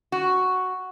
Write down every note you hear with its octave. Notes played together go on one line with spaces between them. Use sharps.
F#4